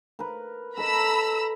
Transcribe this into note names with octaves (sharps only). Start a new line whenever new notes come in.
A#4 B4
A4 D#5 A#5 B5 E6